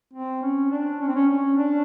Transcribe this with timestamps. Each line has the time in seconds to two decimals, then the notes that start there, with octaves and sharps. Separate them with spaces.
0.13 C4
0.42 C#4
0.70 D4
1.00 C#4
1.07 C4
1.15 C#4
1.29 C#4
1.57 D4